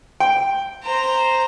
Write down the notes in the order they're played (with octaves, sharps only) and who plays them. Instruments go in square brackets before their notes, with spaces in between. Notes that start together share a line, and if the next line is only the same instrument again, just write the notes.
[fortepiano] G5
[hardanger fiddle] C5 A#5